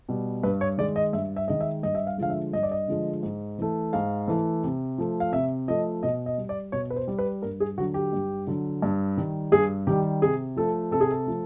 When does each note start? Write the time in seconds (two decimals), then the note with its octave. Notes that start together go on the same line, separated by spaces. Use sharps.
0.09 B2 G3
0.43 G2 B4
0.61 C#5
0.78 D#3 G#3 D5
0.96 D#5
1.13 G2 E5
1.36 E5
1.48 D#3 G#3 D#5
1.61 E5
1.83 G2 D#5
1.95 E5
2.07 F5
2.18 D3 F3 G#3 F5
2.30 E5
2.53 G2 D#5
2.63 D5
2.71 D#5
2.88 D3 F3 G#3
3.23 G#2
3.59 E3 A3
3.93 G#2 F5
4.28 E3 A3
4.63 C3
4.98 F3 A3
5.20 F5
5.32 C3 E5
5.68 F3 A3 D#5
6.03 B2 D#5
6.26 D#5
6.38 G3
6.49 D5
6.72 B2 C#5
6.90 B4
6.96 C5
7.08 G3
7.19 B4
7.42 G2 A#4
7.60 G#4
7.78 D3 F#3 F#4
7.94 G4
8.13 G2
8.47 D3 F#3
8.82 G2
9.17 D#3 G3
9.52 G2 G#4
9.87 D#3 G3 G4
10.22 C3 G#4
10.56 F3 A3 A4
10.91 C3 A4
11.01 G#4
11.11 A4
11.27 F3 A3